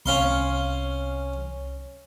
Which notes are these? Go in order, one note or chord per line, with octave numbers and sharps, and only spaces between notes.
C2 C#4 F5 C6